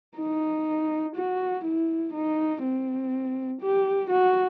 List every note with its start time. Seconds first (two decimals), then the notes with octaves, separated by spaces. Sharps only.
0.17 D#4
1.16 F#4
1.64 E4
2.13 D#4
2.62 C4
3.61 G4
4.10 F#4